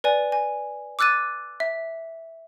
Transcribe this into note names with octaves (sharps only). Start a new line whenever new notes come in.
B4 D5 G#5
G#5
D6 E6 F#6 A6 D#7
E5